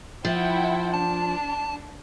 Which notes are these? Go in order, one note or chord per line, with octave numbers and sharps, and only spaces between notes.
F3 E4 F#5 G5
D4 A5